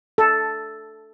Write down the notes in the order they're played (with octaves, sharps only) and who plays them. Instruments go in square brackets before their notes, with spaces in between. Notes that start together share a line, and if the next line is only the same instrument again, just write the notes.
[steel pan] A4